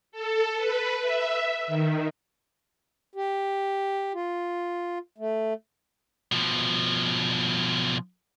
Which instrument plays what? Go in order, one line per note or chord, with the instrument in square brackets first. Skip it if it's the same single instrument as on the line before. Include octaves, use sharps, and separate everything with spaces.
[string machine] A4
B4
E5
D#3
[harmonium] G4
F4
A3
[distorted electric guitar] B2 F3